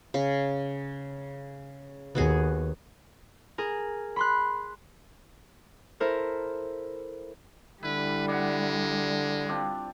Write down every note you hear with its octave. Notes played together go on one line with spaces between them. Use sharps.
C#3
D#2 B3 F#4 G#4
G#4 A#4
B5 C6 F#6
E4 A4 A#4 C5
D3 G3 E4 B4
G#3 D5 F#5
C4 D4 F4